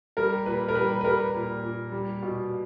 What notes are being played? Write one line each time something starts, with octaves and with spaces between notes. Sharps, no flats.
G3 A#4
A#2 B4
A#4
G3 B4
B4
G3 A#4
A#2
A#2
G3
B2